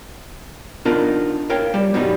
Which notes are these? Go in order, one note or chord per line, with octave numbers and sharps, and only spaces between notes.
B3 D4 D#4 F4 A#4
A#4 C#5 F5 G5
G3
G2 B2 F#3 G3 D#4